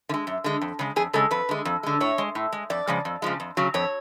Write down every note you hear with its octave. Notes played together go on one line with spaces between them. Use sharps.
D3
G#3
F#2
D3 G#3
F2
C#3 G#3
F2 G#4
C#3 G#3 A4
F2 B4
D3 G#3
F2
D3 G#3
A2 C#5
G#3
A2
G#3
F2 D5
C#3 F3 G#3
F2
C#3 F3 G#3
F2
C#3 F#3
F2 C#5